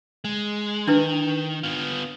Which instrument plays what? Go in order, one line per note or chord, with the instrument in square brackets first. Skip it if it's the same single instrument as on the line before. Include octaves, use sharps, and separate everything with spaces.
[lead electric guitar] G#3
[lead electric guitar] D#3 [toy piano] D4 E4 B4
[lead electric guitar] B3 F4